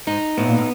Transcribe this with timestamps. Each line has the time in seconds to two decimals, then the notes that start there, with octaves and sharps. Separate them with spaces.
0.07 G#2 D#4
0.37 A2 B3
0.47 A#2
0.57 A2